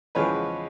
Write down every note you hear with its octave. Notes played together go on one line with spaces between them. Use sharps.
E2 C#3 F3 G#3 B4 C#5